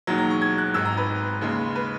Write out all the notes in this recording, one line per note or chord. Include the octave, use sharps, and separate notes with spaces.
E1 D#2 D#3 F#3 A#5
A#5
C#6
G#6
F#6
G#1 G#2 D#3 E6
A#5
B4
D#2 C#3 G#3
B4